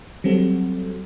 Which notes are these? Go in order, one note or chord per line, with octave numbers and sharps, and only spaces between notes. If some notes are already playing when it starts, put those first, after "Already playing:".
F#3 G3 C4 F#4 A4